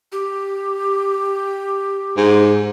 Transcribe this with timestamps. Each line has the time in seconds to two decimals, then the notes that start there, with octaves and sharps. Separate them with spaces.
0.12 G4
2.17 G#2